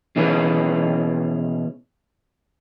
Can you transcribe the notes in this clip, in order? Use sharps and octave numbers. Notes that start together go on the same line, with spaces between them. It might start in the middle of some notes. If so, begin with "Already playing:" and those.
B2 E3 C#4 G#4 B4